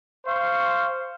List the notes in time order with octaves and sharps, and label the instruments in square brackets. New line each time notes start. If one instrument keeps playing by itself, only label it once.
[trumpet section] C5 F5 C#6